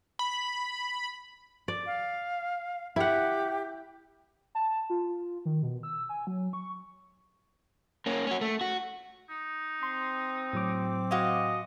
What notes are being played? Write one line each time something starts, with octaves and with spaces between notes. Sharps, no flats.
B5
D5
F5
E4 G4 F#5
A5
F4
D#3
B2
E6
G#5
F#3
C#6
A#3 C#4
C#4 F#4
A3
F#4
D#4
C4 C6
A2 F#3 D6
F#4 D#5 F5 G#5